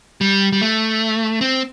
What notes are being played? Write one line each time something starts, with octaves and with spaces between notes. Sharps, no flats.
G3
G3
A3
C4